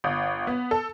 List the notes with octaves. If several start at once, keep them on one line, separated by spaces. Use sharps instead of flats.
G1
B3
A4